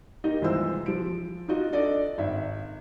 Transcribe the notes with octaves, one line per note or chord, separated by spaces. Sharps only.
A#3 D#4 G4 D#5
C2 E3 G#3 F4 C5 E6
F3 D7
D#4 F4 F#4 D#5
D4 A4 D5 D#5
G#1 E5